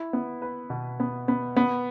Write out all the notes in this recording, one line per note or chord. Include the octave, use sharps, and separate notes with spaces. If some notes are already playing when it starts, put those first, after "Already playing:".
Already playing: E4
B3
B4
B2
B3
B3
B3